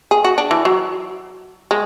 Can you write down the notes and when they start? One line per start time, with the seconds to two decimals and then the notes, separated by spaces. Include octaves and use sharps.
0.11 G#4
0.24 F#4
0.38 D4
0.51 E3
0.65 F#3
1.71 G#3